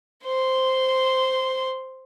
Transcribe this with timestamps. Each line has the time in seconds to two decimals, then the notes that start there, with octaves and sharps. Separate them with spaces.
0.25 C5 C6